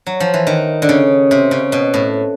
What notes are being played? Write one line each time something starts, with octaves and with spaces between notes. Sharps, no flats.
F#3
F3
E3
D#3
D3
C#3
C3
C#3
B2
A2